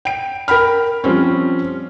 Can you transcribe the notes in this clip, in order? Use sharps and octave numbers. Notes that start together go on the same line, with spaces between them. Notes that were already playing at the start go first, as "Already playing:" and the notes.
G5 D7
A#4 G5 B5 F6
F3 G3 C4 C#4